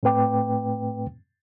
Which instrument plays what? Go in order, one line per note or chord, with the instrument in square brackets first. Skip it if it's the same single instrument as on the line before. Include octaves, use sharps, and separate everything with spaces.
[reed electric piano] A2 A3 C4 B4 G5 D6